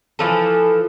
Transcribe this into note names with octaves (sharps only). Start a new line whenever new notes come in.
E3 F3 A4